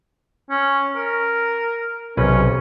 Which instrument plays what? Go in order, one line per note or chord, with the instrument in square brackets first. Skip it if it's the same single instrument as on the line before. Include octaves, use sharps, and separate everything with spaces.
[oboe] C#4
A#4
[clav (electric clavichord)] B1 C3 B4 [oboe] C#4